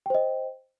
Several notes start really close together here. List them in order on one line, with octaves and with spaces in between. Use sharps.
G5 C5 D#5